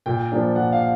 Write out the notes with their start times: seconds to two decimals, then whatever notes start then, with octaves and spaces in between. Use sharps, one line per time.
0.06 A#2 G5
0.32 F3 A#3 D4
0.55 A#2 F#5
0.73 F5